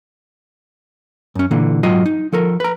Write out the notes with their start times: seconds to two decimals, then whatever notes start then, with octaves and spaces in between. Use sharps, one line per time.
1.35 F#2 C#4
1.51 A#2 D3 E3 A#3
1.83 B1 G#2 F#3 F4 D#5
2.06 D#4
2.32 F3 A4 A#4
2.60 B4 A#5